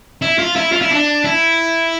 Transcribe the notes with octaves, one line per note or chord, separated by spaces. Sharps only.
E4
F4
E4
F4
E4
D4
E4